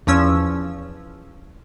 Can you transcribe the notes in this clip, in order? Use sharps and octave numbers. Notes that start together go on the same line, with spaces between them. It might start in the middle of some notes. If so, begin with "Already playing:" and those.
E2 F3 C#4 E6